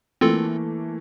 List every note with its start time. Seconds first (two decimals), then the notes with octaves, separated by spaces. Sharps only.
0.21 E3 A3 A#3 C4 F4 A4